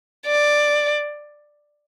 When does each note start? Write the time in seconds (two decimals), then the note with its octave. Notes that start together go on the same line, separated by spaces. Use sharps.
0.26 D5